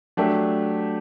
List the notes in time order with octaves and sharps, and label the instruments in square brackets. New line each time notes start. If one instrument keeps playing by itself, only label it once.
[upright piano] F#3 A3 D4 G4